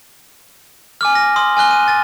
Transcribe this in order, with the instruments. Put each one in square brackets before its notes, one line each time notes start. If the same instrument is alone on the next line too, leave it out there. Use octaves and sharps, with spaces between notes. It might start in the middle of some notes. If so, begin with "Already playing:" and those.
[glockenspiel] G#5 D6 F6
A#6
C6 D#6
G#5 F6 F#6 G7
D#7
A6